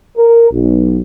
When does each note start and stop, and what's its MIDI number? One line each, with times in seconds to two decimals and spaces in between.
0.17 0.51 70
0.51 1.00 35